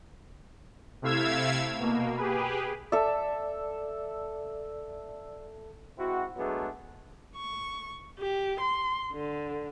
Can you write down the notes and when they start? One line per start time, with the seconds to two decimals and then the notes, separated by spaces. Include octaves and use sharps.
1.02 C3 A3 E4 F5 E6 G#6
1.79 B2 A#3
2.17 G4 G#4 B4
2.92 A4 D5 E5
5.98 G#3 C4 E4 F#4
6.37 F#3 G#3 A3 B3 D4 G#4
7.36 C#6
8.19 G4
8.60 C6
9.13 D3